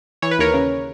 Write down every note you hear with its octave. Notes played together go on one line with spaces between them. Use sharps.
E3 C#5
B4
D#2 A#4 C#5
C#3